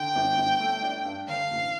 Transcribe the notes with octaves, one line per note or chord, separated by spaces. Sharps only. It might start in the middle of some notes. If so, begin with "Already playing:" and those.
Already playing: D3 G5
G1
G1
A3
D4
G2
D3 F5
A1